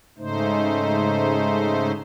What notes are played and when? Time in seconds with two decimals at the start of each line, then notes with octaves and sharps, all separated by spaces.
0.18 G#2 C#3 A3 D#4 C5